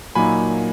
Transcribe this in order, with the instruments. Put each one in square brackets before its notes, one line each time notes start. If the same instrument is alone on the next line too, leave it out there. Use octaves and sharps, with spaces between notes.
[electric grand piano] A#2 F#3 A#3 D#4 G#5 B5